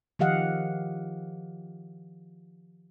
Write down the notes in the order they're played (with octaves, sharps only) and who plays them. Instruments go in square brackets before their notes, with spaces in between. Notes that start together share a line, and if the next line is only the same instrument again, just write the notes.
[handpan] D#3 F3 G4 D#5 F5 F#5